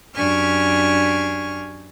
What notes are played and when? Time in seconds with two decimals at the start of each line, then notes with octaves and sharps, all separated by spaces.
0.16 F#2 D4 G4 G#5 C#6 F6